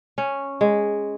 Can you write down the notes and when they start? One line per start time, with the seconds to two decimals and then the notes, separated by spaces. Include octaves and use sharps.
0.18 C#4
0.61 G#3